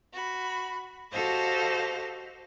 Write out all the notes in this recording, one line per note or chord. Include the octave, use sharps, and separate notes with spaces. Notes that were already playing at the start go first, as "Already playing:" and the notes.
F#4 B5
F#4 G4 A4 C5 D#5 F5